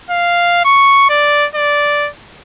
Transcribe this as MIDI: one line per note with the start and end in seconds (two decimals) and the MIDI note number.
0.10 0.60 77
0.65 1.09 85
1.10 1.46 74
1.55 2.09 74